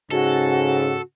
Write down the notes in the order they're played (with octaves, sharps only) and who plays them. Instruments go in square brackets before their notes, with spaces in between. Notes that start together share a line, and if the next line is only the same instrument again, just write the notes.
[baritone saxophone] G#2 [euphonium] C#3 [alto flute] F#4 [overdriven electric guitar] A4